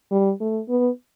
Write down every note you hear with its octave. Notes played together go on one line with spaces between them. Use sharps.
G3
A3
B3